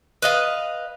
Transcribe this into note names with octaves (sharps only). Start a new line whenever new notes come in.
B4 D#5 F5